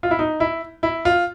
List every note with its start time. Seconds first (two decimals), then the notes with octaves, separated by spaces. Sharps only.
0.03 F4
0.11 E4
0.19 D#4
0.40 E4
0.83 E4
1.05 F4